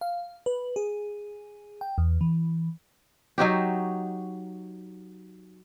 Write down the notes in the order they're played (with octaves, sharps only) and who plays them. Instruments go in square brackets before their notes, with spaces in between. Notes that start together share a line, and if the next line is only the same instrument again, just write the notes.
[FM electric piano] F5
B4
G#4
G5
E2
E3
[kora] F#3 D#4 F#4 G4